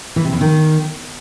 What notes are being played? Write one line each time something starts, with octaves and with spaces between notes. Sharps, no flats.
E3
C3
E2
D#3